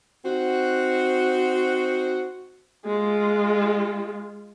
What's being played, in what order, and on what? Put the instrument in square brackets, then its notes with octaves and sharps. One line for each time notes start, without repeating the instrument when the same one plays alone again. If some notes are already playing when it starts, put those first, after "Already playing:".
[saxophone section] C4 D#4 F#4
[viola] G#3 F4